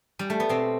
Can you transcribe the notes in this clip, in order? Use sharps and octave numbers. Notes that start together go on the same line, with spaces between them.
G3
A3
B3
B2 C4